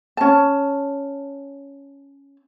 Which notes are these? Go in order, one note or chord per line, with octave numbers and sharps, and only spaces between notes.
C#4 A5